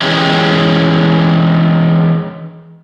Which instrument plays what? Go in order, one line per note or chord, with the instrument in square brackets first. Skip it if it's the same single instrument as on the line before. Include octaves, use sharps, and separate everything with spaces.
[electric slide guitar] E3 G#3 C#4 G4